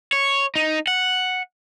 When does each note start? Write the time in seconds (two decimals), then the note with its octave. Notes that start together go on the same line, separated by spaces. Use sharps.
0.13 C#5
0.56 D#4
0.88 F#5